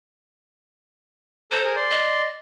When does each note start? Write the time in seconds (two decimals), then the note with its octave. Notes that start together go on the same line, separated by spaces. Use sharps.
1.52 A4 C5 A#5
1.64 G#4 A#4
1.76 D5 C6
1.91 D#5